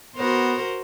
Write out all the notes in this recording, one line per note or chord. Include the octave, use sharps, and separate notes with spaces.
B3 F#4 A#4 C5